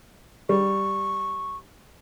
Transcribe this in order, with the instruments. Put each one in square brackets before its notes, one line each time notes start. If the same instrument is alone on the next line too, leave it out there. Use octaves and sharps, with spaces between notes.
[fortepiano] G3 [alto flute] C#6